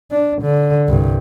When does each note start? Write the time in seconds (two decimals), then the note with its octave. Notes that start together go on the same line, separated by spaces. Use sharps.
0.11 D4
0.42 D3
0.88 C2 G2